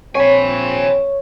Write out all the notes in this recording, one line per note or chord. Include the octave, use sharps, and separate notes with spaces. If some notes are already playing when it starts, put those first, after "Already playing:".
A#1 C4 C#5 G#5 B5